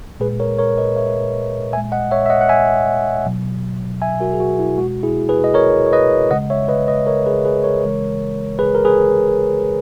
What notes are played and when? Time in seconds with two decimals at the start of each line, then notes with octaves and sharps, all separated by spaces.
0.20 A#2 G#3 G#4 B4
0.40 A#4 C#5
0.59 A#4 C#5
0.78 B4 D#5
0.96 C#5 E5
1.73 A#2 E5 G#5
1.77 G#3
1.92 D#5 F#5
2.11 C#5 E5
2.26 E5
2.30 D#5 F#5
2.41 F#5
2.49 E5 G#5
3.26 B2 F#3
4.02 E5 G#5
4.20 F#4 A#4
4.34 G#4
4.40 F#4
4.59 E4
4.78 B2 G#3 F#4
5.03 E4 G#4
5.29 G#4 B4
5.44 D#5
5.54 A#4 C#5
5.87 C#5
5.93 B4 D#5
6.31 C#3 G#3 D#5 F#5
6.50 C#5 E5
6.68 B4 D#5
6.88 B4 D#5
7.07 A#4 C#5
7.26 G#4 B4
7.45 G#4 B4
7.64 A#4 C#5
7.84 C#3 E3 G#3
8.59 G#4 B4
8.75 A#4
8.85 G#4 B4